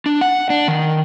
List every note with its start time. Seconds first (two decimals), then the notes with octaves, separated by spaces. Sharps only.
0.06 D4
0.21 F#5
0.50 D4
0.68 D#3